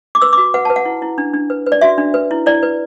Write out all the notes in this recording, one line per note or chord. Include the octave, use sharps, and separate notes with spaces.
D6
B4 E6
D6
F#4
B4 F#5
B4 A5
F#5
E4
E4
D4
D4
B4
B4
D5
F#4 E5
D4
B4
E4
E4 D5
B4